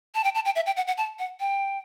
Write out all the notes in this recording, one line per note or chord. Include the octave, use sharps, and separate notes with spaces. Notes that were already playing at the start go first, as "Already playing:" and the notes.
A5
G5
A5
G5
E5
G5
F#5
F#5
A5
F#5
G5